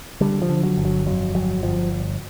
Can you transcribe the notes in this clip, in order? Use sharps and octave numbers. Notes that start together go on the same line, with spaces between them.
D3 G3
F3
D3
F#3
G1
F#3
F2 F#3
G1 F#3
G1 F3